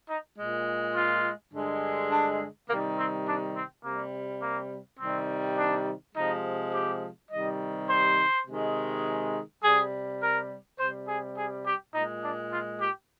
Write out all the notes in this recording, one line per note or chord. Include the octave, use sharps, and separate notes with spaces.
D#4
A#2 G#3
F4
G2 D3 G#3
D4
C3 D#3 G3 A#3
C4
D4
C4
C3 G3 A#3
A#3
C3 D#3 G3 C4
D4
C3 F3 G#3 D#4
G4
C3 D#3 G3 D#5
C5
C3 D#3 G#3
C3 G3 G#4
A#4
C3 G3 C5
G#4
G#4
G4
A#2 G#3 D#4
D4
F4
G4